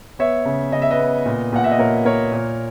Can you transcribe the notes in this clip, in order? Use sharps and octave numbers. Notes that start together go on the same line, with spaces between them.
B3 C#5 E5
C#3
C#3 D#5
E5
B4 D#5
B3
A#2
A#2 F#5
E5
D#5
A#2 A#4 C#5
A#3 A#4 C#5
A#2